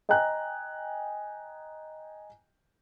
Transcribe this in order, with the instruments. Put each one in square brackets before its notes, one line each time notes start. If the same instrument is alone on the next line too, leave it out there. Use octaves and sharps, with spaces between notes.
[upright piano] D#5 G5 G#5 A#5 F#6